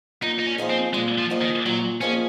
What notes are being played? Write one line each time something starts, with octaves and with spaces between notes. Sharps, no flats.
A#2 D#4
D#4
C#4
F3 A#3 D#4 G#4
C4
A#2 G#3
F3
F3 A#3 D#4 G#4
D#3
A#2 F#3
F3 A#3 C#4 D#4 G#4